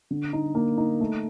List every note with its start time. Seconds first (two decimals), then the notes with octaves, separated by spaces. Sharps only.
0.11 D3
0.33 D#4
0.55 A#3
0.78 D#4
1.01 A3